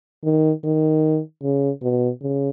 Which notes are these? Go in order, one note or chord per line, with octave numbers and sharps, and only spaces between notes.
D#3
D#3
C#3
B2
C#3